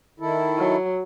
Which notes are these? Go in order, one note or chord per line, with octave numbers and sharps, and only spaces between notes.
D#3 E4 A4
F#3